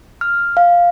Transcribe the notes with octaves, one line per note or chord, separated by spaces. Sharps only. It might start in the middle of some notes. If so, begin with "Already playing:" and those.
F6
F5